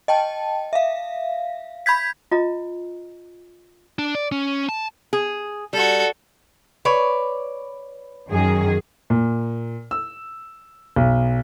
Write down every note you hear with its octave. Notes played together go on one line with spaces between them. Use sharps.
D#5 G5 A5
E5 F5
B5 G6 G#6 B6
F4 D#5 A#5
D4
D5
C#4
A5
G#4
G3 F#4 A4
B4 C#5 D5
F#2 D#3 G#4
A#2
E6
B1